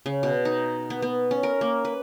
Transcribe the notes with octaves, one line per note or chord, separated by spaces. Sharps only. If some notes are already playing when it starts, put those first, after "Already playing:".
C#3
B2
D#4
B3
B3
C#4
A#4
A#3
B4